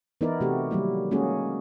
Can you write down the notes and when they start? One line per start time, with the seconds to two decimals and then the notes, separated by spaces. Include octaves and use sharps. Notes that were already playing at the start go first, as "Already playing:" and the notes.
0.21 E3 B3 D#4 E4 A#4 D5
0.41 C3 A3 F#4 G4
0.71 D#3 F#3 G3 A#3 E4
1.11 G#3 A#3 C#4 F#4 G#4